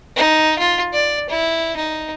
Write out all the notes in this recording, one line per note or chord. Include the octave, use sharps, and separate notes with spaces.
D#4
F4
D5
E4
D#4